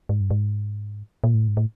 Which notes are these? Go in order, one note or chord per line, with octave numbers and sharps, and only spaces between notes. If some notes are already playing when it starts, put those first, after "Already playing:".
G#2
G2
G#2
A#2
A2
G#2
A2